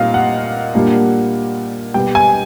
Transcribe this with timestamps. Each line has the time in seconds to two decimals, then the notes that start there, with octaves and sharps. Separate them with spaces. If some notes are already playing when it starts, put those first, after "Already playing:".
Already playing: A#2 G3 C4 D#4 D#5 F5
0.14 F#5
0.74 A#2 G3 A#3 D4
1.94 B2 G3 B3 G5
2.15 G#5